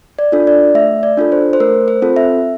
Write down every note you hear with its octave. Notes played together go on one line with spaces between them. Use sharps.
D5
D4 F4 A4
D5
A3 E5
D5
D4 F4 A4
C5
C5
A3 A#4
C5
C4 F4 A4
E5